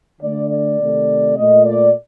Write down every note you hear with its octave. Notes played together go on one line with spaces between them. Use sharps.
D3 A3 D5
D5
C3 D#3 A3
A#2 A3 D#5
D5